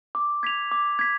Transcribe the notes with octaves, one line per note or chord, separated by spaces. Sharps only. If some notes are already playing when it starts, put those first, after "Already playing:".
D6
G#6 B6 F7
D6
G#6 B6